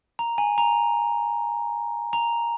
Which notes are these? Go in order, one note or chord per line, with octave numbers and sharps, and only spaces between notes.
A#5
G#5
A#5
A#5